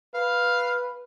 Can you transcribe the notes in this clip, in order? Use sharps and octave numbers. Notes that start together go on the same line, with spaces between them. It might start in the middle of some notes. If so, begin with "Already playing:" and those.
B4 F5